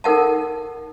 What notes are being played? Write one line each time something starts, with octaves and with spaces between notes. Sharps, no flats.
D#4 A4 A#4 F#5 A5